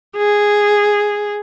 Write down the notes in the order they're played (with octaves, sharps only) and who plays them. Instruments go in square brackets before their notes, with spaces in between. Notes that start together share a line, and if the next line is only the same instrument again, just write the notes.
[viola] G#4